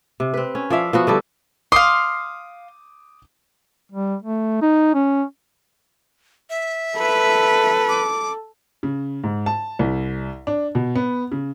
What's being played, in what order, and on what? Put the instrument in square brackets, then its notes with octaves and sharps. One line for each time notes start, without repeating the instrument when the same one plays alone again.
[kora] C3
C4 B4
C#4
F3 D5 E5 F5
F3 B3 F#4
D3 G3 A4
[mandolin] F5 C6 [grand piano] D6 D#6
[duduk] G3
A3
D#4
C#4
[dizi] E5
[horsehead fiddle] A4 [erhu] B4
[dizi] D6
[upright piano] C#3
G#2
A5
C2
D4
B2
B3
C#3